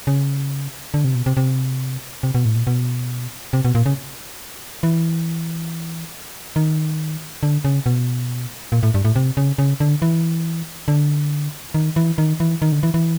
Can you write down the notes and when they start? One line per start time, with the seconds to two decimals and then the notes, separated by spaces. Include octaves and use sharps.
0.07 C#3
0.94 D3
1.04 C3
1.15 B2
1.26 C3
1.37 C3
2.23 C3
2.35 B2
2.45 A2
2.56 A#2
2.67 B2
3.53 C3
3.65 B2
3.75 A#2
3.86 C#3
4.83 E3
6.56 D#3
7.43 D3
7.65 C#3
7.86 B2
8.72 A#2
8.83 A2
8.94 G2
9.05 A2
9.16 C3
9.37 C#3
9.58 C#3
9.80 D3
10.02 E3
10.88 D3
11.74 D#3
11.96 E3
12.18 D#3
12.40 E3
12.62 D#3
12.72 D3
12.83 E3
12.94 E3